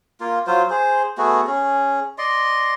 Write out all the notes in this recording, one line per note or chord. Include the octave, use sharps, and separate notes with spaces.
A#3 F4
F#3 F4 C5
G#4 C5
A3 B3 F#4 G#4
C#4 G#4
D5 D#5 C6